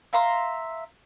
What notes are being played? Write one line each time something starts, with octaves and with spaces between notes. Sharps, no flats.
E5 F5 A#5 C6